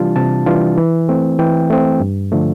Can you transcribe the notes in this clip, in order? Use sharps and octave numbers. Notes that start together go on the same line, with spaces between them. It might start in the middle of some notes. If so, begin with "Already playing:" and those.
Already playing: C3 E3 G3 D4 F4 A5
C3 A5
E3 G3 D4 F4
E3
A3 C4
E3 G5
A3 C4
G2
D3 F3 A3